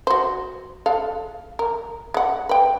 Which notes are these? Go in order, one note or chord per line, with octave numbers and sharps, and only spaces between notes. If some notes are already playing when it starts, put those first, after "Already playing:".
F#4 C5
G#3 A4 F5
A#4
G#3 F#5
B4 G5